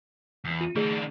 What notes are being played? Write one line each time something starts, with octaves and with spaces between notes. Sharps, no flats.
E2
F4 D#7
D#3 A3 D4 G#4 D5